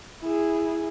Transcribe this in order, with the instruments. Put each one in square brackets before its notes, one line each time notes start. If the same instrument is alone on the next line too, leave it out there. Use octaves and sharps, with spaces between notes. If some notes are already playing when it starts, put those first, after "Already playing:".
[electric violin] E4 G#4